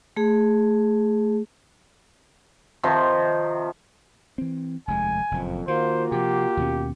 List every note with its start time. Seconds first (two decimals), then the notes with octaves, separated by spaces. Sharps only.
0.16 A3 G#4
2.83 C3 D#3 F3 C6
4.38 E3 C4
4.88 F1 D#2 G#3 G#5
5.31 F#1 F2 A#2
5.68 D#3 A#3 F4 F#4 C5
6.12 C3 F3 G4
6.57 D#2 B2 C#4